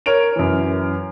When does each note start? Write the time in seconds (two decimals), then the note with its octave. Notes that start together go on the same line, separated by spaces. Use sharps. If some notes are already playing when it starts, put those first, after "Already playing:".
0.06 A#4 C#5 D7 F7
0.36 F#2 E3